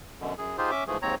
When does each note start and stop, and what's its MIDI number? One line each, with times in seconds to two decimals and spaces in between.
0.21 0.34 42
0.21 0.34 47
0.21 0.34 50
0.38 0.57 42
0.38 0.57 68
0.58 0.71 63
0.58 0.71 65
0.58 0.71 67
0.58 0.71 68
0.58 0.71 72
0.71 0.84 61
0.71 0.84 76
0.71 0.84 86
0.87 0.97 44
0.87 0.97 52
0.87 0.97 53
0.87 0.97 57
0.87 0.97 68
1.02 1.15 39
1.02 1.15 44
1.02 1.15 60
1.02 1.15 73
1.02 1.15 82